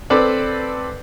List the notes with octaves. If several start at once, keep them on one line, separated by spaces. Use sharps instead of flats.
C4 A4 B4 D5